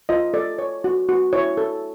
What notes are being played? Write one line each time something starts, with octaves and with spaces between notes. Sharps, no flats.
F4 D#5
A4 D5
C#5
F#4
F#4
E4 C#5
A4